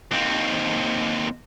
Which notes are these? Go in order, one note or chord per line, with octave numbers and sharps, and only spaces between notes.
D#2 C4